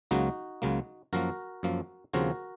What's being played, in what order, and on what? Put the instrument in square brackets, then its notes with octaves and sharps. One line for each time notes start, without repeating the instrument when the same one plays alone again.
[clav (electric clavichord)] C#2 C#3 F#3 A#3 D#4 F#4
C#2 C#3 F#3 A#3
F#2 F3 A#3 F#4 A#4
F#2 F3 A#3
D#2 C#3 F3 C4 F#4 A#4